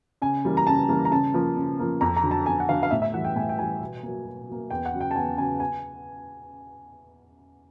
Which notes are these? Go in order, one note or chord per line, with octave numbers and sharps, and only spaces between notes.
C#3 G#5
E3 G3 A#3
A#5
C#3 A5
E3 G3 A#3
A#5
C#3 A5
F3 A#3
C#3
F3 A#3
F2 A#5
A#5
D3 F#3
A5
F2 G#5
F#5
D3 F#3 F5
F5
A2 E5
E5
E3 G3 F#5
G5
A2 G#5
G5
E3 G3 G#5
B2
F#3 A#3
B2
F#3 A#3
E2 G5
F#5
C#3 F#3
G5
A5
E2 G#5
C#3 F#3 G#5
G#5